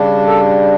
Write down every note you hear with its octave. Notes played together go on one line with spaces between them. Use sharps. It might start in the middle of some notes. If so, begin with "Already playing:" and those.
Already playing: C#3 G3 D4
A4